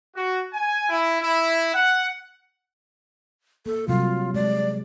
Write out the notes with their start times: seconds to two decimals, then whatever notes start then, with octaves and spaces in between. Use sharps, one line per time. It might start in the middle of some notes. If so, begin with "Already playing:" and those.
0.16 F#4
0.53 G#5
0.89 E4
1.22 E4
1.74 F#5
3.66 A#3 A4
3.88 C3 F#3 G3 F4
4.34 G#3 D5